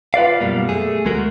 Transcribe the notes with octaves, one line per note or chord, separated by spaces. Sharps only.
F4 B4 D5 F5
F#2 B2 G3 A#3
A3 G#4
D2 G#3 A3 F#4 A#4